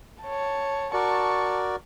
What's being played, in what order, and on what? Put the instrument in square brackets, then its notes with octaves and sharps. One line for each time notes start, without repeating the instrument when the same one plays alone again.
[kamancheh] C#5 A5
[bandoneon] F#4 A#4 D5 [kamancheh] A5 C#6